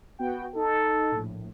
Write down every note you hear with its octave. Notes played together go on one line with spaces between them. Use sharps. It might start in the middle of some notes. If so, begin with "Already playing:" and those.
B3 F#4 G5
D#4 A4
A#1 A2